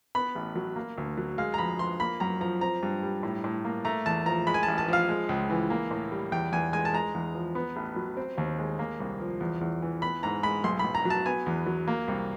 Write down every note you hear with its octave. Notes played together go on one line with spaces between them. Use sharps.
B3 B5
A1
F#3
A#3
D2
F#3
G#3 F5
A#5
F2 B5
F3 C6
A#3 B5
F#2 A#5
F3 A#5
C4 A#5
G2
G3
A2
A2
A#3
A3 A#5
E2 A5
F3 A#5
G#3 B5
G#5
A1 A5
A5
F3 F5
G#3
C#2
E3
A#3
A2
G3
E2 G5
E2 G#5
G#3 G#5
A5
G#3 A#5
E2
F3
B3
A1
F#3
C4
D#2
G#3
A#3
C2
F3
E2
E2
E3
B3 B5
G#2 A#5
G#3 B5
B1 C6
B1 B5
A#5
F#3
A5
B3 G#5
E2
F#3
A#3
C2